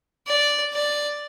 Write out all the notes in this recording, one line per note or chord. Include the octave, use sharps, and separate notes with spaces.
D5
D5